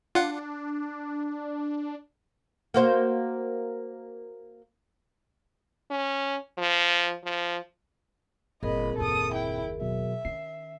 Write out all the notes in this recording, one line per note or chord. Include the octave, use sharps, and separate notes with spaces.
D4 F4 F#5
A#3 F#4 C5
C#4
F3
F3
G1 A#2 C4 G#4 A#4 D#5 B5
F#1 D#2 A4 D#6
E4 G5
B2 F#3 E5
D#3 C#4 C7